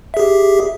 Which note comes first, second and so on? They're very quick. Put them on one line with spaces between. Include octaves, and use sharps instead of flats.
E5 G#4 G4